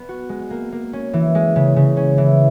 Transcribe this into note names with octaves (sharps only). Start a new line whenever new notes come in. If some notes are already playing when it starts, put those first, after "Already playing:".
Already playing: B3
F#4
G#3
A#3
A#3
C#4
E3
G#3
C#3
C#3
C#4
E3